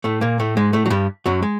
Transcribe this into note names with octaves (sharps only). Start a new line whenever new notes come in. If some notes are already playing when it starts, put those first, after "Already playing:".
A2 A3
A#2 A#3
A2 A3
G#2 G#3
A2 A3
F#3
G2 G3
F#2 F#3
G#3